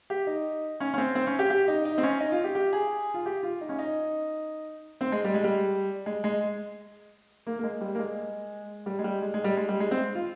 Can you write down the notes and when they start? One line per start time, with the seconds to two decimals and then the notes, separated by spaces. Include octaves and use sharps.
0.10 G4
0.27 D#4
0.80 C#4
0.94 C#4
0.98 C4
1.15 C4
1.27 C#4
1.39 G4
1.50 G4
1.68 D#4
1.85 D#4
1.98 C4
2.03 C#4
2.20 D#4
2.32 F4
2.44 G4
2.55 G4
2.73 G#4
3.14 F4
3.26 G4
3.43 F4
3.61 D#4
3.69 C#4
3.79 D#4
5.01 C4
5.12 G#3
5.24 G3
5.34 G#3
5.44 G3
6.06 G#3
6.24 G#3
7.47 A#3
7.59 A#3
7.63 G#3
7.81 G3
7.95 A#3
7.99 G#3
8.86 G3
8.99 G#3
9.04 G3
9.22 G#3
9.34 G#3
9.44 G3
9.57 G#3
9.69 G3
9.80 G#3
9.91 C4
10.15 F4